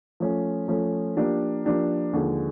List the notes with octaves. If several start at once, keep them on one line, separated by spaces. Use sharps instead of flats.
F3 A3 C#4
F3 A3 C#4
F3 A#3 D4 G4
F3 A#3 D4 G4
D#2 D3 F3 G#3